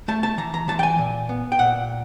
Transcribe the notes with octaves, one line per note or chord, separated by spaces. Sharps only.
A3 A5
A5
E3 A#5
A#5
E3 A5
G5
G#5
A#2
B3
G5
A#2 F#5